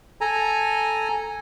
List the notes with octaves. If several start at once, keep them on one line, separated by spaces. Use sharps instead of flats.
A4 G#5 A#5